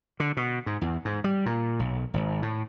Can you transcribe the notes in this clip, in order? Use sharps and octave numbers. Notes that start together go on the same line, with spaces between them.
D3
B2
G#2
E2
G#2
G3
A#2
B1
G#1
A2